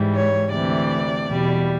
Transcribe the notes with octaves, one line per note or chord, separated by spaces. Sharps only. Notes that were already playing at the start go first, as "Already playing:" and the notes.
Already playing: G#2 E3 G3
C#5
D2 C3 E3 D5
E2 B2 G3